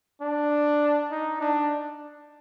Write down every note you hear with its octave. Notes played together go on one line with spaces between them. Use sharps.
D4
D#4
D4